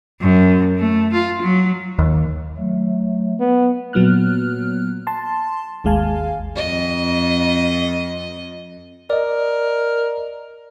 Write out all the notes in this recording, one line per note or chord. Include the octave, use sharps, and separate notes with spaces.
F#2
A3
F4
F#3
D#2
F#3 A3
B3
A#2 F#3 B3 F6 F#6
A5 C6
G#1 D#2 G#3 F5 G#5 A5
F2 D#5
A#4 D5 D#5